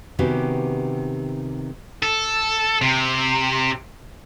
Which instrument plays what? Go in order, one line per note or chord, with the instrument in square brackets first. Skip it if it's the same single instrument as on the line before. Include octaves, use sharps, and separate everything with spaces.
[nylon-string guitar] C3 D#3 B3 C#4 F#4 G4
[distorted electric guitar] A4
C3